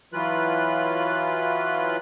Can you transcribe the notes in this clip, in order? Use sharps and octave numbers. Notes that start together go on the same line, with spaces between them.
E3 F#3 F4 B4 F#6